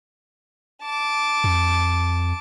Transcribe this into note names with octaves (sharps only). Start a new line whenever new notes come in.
A5 D6
F2